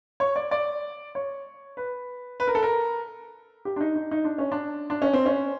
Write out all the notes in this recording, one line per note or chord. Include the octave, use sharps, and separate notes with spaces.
C#5
D5
D5
C#5
B4
B4
A#4
A4
A#4
G4
D4
D#4
D#4
D#4
D4
C#4
D4
D4
C#4
C4
C#4